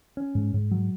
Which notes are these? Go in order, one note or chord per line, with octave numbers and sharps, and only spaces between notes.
C#4
G#2
G#2
F#3